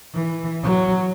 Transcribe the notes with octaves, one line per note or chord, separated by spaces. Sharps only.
E3
F#3